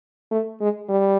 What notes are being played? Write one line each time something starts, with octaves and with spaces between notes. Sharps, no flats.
A3
G#3
G3